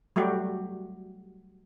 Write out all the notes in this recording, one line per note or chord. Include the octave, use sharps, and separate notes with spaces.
F#3 G3 A3 F#4 G4